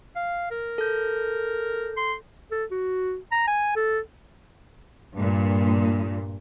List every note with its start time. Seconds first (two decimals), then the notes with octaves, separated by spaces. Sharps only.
0.16 F5
0.51 A#4
0.78 A4 G6
1.97 C6
2.51 A4
2.71 F#4
3.32 A#5
3.47 G#5
3.76 A4
5.15 G2 A#2